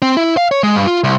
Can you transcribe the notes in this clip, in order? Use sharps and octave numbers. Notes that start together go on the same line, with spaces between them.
C4
E4
F5
C#5
G#3
G2
F4
C2